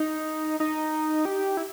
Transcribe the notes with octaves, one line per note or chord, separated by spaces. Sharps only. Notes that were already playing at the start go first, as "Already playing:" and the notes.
Already playing: D#4
D#4
G4
E4